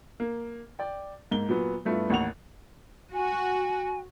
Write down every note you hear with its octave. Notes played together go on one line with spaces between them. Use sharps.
A#3
D5 G5
G#2 A#3 G7
A#2 F#3 B3
G2 A3 B3 E4 F4
A1 D#2 F#5 F7
F#4 G#5